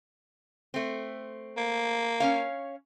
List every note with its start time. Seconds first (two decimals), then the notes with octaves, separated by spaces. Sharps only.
0.74 A3 C4
1.57 A#3
2.20 C#4 C#5 F5